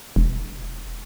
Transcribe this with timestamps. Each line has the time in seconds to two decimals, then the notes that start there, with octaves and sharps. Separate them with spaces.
0.16 E1